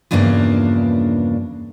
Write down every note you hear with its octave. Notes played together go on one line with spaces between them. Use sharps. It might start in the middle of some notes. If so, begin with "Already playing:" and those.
E2 G2 C#3 F3 A#3 D4